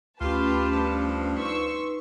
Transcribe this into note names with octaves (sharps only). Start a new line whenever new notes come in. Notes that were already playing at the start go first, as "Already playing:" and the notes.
D2 A3 C#4 F4 G4 B4 A5
G2 F3
D#4 B4 C6 C#6 E6